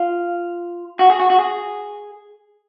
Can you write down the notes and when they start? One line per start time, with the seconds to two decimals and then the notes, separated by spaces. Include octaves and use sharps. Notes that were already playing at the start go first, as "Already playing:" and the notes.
Already playing: F4
0.99 F#4
1.10 G#4
1.20 F#4
1.30 F#4
1.39 G#4